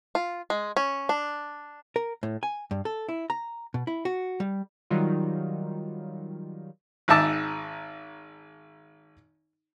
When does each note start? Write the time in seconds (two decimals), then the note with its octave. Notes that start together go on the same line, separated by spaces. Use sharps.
0.15 F4
0.50 G#3
0.77 C#4
1.09 D4
1.96 A#4
2.23 A2
2.43 G#5
2.71 G2
2.85 A4
3.09 E4
3.30 A#5
3.74 B2
3.87 E4
4.05 F#4
4.40 G3
4.90 D#3 F#3 G3 D#4 F4
7.08 G#1 G#2 D#4 E5 A5 D6